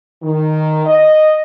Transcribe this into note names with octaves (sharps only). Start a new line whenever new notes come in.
D#3
D#5